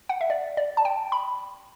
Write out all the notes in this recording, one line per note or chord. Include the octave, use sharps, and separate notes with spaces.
F#5
E5
D5
D5
A5
G5
B5